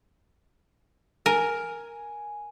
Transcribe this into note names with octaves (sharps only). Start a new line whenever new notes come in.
A#4 G#5